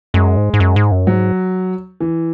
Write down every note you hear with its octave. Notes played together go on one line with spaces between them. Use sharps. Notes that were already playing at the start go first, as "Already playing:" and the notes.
F#2 G#3
G#2
G#2
F#2
G#2
F#2
G#2 F#3
E3